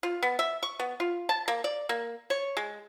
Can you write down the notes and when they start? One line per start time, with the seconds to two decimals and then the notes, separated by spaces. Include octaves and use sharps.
0.03 F4
0.23 B3
0.39 E5
0.63 C#6
0.79 B3
1.00 F4
1.29 A5
1.48 A#3
1.64 D5
1.89 A#3
2.30 C#5
2.57 G#3